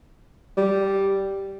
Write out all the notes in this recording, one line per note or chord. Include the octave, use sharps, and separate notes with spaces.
G3